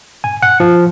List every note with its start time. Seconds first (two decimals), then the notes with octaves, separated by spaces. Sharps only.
0.24 G#5
0.42 F#5
0.60 F3